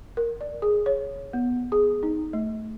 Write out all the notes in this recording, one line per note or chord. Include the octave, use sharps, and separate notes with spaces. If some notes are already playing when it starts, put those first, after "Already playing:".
A#4
D5
G#4
C#5
B3
G#4
D#4
A3